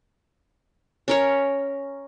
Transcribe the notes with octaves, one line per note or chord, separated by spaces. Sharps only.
C#4 A#4 C#5